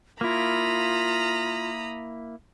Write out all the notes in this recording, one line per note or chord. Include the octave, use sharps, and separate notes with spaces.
A#3 E4 F4 A#5 B5 D#6